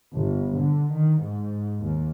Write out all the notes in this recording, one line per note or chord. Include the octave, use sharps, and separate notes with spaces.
G1
D3
D#3
G#2
D#2